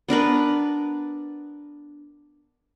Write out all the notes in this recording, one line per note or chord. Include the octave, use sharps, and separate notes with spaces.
B3 D4 A#4 B4